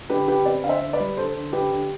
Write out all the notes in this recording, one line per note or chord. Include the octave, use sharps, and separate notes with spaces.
D3 G4 B4
D3 G4 B4
C4 B4 D5
D3 F5
C5 E5
D3
B4 D5
G3
D3 A4 C5
D3
D3 G4 B4
D3